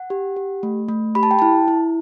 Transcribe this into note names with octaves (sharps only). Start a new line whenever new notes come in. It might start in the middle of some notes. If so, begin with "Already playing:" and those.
Already playing: F#5
G4
G4
A3
A3
G4 B5
A5
G5
E4 A5
E4